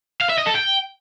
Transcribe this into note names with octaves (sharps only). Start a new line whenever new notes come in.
F5
E5
D#5
A4
G5